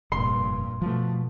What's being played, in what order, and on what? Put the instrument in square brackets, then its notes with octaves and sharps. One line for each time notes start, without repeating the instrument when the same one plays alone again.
[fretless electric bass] F1 [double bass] G2 A#2 [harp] C6
[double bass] B2 [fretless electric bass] F3 A3